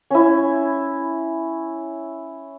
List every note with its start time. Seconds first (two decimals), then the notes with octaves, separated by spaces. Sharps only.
0.10 C#4 E4